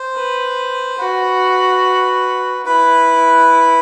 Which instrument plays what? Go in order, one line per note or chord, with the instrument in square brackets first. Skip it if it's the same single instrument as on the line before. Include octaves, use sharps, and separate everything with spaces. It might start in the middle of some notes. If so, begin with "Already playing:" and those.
Already playing: [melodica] C5
[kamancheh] B4
[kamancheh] F#4 [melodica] B4
[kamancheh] E4 [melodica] B4